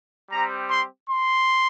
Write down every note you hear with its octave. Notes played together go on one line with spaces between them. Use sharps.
G3 C4 G4 A#5
C6
C6